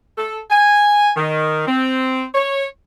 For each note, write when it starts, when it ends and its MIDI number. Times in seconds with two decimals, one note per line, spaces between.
0.18 0.39 69
0.51 1.10 80
1.16 1.64 51
1.67 2.24 60
2.34 2.65 73